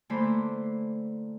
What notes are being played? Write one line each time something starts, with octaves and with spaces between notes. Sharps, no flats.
D3 E3 A3 A#3 C5 B5